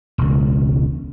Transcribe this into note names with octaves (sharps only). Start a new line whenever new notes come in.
E1 C#2